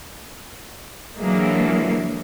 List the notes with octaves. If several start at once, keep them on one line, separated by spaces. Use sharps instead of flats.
D3 E3 F#3 G#3 A#3